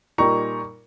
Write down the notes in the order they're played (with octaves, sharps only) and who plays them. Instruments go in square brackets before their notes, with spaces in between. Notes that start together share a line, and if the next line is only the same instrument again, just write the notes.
[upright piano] A#2 G3 A#3 D#4 A#5 C#6